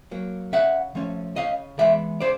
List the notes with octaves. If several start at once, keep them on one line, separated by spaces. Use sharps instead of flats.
F#3 A#3
C#3 E5 F#5
F3 A3 C#4
C#3 D#5 F5
E3 G#3 B3 D5 E5
C#3 C5 D5